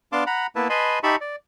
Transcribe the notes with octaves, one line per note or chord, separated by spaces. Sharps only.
B3 D4 F5 A5 C6 D6
F#5 A#5 B5
A#3 B3 E4 B4 E5 A5
B4 D#5 G#5 A5 B5 C6
D#4 G4 E5 A5 B5 C#6
D5